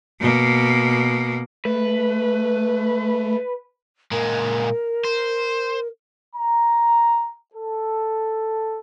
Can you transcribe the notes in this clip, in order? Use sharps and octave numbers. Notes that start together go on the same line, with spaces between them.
B2 A#3
A3 B4
A#2 G#3 A#4
C5
A#5
A4